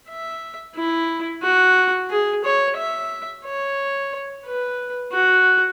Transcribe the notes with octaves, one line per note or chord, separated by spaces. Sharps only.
E5
E4
F#4
G#4
C#5
E5
C#5
B4
F#4